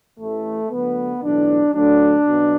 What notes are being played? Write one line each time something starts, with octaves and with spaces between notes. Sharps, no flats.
A1 A2 E3 A3
D2 D3 F#3 B3
B1 A2 E3 D4
D2 D3 F#3 D4
B1 B2 F#3